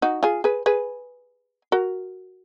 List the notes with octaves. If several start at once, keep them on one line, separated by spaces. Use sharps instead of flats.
D#4 F#4
F4 G#4
G#4 B4
G#4 B4
F#4 A#4